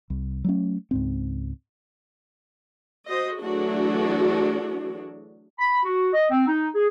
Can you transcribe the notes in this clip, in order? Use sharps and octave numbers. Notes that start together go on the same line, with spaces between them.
C2
F#3 A3 C#4
C#2 G#2 C4
F#4 C5 D#5
E3 F#3 A3 D4 F#4 G#4
B5
F#4
D#5
C4
D#4
G#4